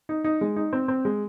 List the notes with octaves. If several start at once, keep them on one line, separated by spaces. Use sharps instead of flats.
D#4
D#4
G#3
D#4
C4
C4
G#3